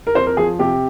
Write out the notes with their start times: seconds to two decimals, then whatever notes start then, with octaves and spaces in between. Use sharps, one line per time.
0.07 A#4
0.15 F2 C5
0.27 A#4
0.37 F3 G#4
0.59 C3 G4